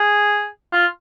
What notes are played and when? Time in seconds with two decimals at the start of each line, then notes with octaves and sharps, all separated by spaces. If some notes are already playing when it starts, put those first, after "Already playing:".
Already playing: G#4
0.72 F4